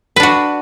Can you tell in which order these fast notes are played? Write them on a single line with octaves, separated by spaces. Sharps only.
B4 D4 F#4